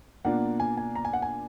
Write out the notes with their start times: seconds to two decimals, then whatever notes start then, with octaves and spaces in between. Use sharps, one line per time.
0.25 B2 A#3 D4 F4 F#5
0.60 G#5
0.77 G#5
0.96 A#5
1.05 G#5
1.13 F#5
1.22 G#5